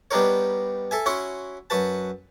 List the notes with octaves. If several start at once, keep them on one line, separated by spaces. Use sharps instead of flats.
G3 B3 D4 D#4 A#4 C#5
A4 E5 G#5
C#4 E4 F#4 C6 C#6
F#2 F#4 B4 A5